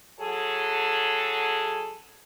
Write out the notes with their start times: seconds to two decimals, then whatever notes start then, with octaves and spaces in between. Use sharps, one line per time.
0.20 F#3 G#4 A4